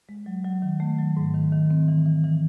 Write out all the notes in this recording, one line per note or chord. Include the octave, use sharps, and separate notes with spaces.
G#3
F#3
F#3
D#3
A3
F#3
G#2
D#3
D#3
C4
E3
E3
E3